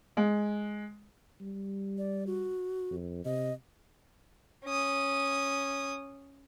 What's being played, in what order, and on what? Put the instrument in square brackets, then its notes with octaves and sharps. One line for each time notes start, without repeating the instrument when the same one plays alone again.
[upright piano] G#3
[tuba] G3
[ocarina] D5
F#4
[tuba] F2
[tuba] C3 [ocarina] D#5
[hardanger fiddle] C#4 D#6